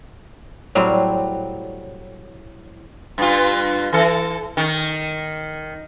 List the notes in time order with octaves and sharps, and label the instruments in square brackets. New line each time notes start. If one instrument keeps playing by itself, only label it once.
[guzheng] A2 F#3 G3 C4
[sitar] G2 F4
E3 A4
D#3